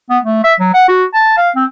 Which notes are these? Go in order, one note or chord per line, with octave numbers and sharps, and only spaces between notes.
B3
A3
E5
F#3
F#5
F#4
A5
F5
C4